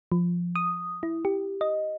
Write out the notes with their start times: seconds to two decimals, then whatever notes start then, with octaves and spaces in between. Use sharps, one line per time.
0.12 F3
0.56 D#6
1.03 E4
1.25 G4
1.61 D#5